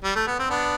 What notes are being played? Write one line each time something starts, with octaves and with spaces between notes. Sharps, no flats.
G3
A3
B3
C4
B3 D4